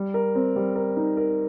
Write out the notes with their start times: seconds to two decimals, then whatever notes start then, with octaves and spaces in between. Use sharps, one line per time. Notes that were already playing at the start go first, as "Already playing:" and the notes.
Already playing: G3
0.14 A#4
0.35 C4
0.56 G3
0.75 A#4
0.97 D#4
1.17 A#4